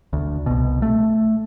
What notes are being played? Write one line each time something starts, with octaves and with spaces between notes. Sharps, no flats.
D2
C2 B2
A3